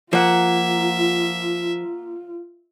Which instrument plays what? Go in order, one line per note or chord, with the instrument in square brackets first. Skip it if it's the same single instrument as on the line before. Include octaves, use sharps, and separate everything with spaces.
[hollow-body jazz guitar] F3 [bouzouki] A#3 F#5 [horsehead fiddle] F4 [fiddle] E5